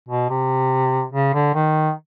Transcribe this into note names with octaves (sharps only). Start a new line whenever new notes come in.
B2
C3
C#3
D3
D#3